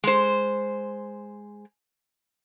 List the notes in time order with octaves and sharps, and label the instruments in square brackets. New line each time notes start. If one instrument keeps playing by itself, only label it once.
[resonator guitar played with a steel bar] G#3 C5